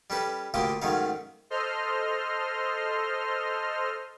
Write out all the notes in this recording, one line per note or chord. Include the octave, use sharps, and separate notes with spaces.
G3 C#4 A4 B4
D2 A2 A#3 F4 G4 A4
G#2 D#3 F#3 A3 C#4 F5
A4 C5 D#5 C6 F6